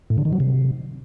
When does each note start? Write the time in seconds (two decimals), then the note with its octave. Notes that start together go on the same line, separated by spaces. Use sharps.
0.10 A2
0.18 D3
0.25 D#3
0.33 F#3
0.40 C3